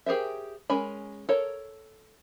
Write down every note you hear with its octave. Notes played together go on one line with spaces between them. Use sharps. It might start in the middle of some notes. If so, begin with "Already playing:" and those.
G4 G#4 A#4 C5 E5
G#3 C#4 A#4 G#5 B5
A4 A#4 C#5 A#5